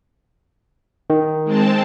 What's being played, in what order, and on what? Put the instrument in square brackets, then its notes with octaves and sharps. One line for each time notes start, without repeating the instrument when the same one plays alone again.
[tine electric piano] D#3
[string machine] G#3 C4 A5